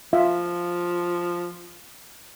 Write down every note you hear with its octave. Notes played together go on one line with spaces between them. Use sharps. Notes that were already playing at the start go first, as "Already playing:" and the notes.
F3 F4 E5 F5